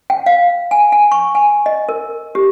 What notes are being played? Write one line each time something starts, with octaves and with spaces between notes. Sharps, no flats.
G5
F5
G#5
G#5
C#6
G#5
D#5
A#4
G4